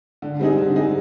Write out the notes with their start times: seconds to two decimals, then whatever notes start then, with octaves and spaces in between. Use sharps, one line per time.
0.22 D3
0.40 G3 C4 D#4 G#4
0.58 D3
0.76 G3 C4 D#4 G#4